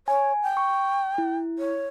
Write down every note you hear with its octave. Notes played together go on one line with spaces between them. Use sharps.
C#5 G#5
G5
C#6
E4
C#5